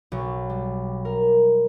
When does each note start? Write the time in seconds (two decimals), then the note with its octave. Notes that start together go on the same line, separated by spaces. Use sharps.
0.12 B1
0.50 G3
1.05 A#4